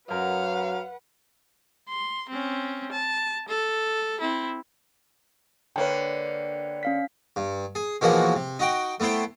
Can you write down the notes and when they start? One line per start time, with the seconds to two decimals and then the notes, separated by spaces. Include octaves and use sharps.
0.10 F#2 F#3 A#4 B4 F5 F#5
1.88 C6
2.29 C4 C#4
2.92 A5
3.48 A4
4.21 C4 E4
5.76 D3 A#3 B4 C#5 G5
6.83 C#4 F5 B6
7.36 G2
7.75 G#4
8.01 B2 E3 F3 G#3 A#3 F#4
8.36 C3
8.59 D#4 F#4 G5
9.00 A3 B3 E4 C5 G5